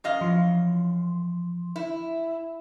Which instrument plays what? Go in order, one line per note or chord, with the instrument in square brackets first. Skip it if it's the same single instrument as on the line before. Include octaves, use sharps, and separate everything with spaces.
[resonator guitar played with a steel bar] F#2 D#5 F5
[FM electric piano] E3 F3 C6
[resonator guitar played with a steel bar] E4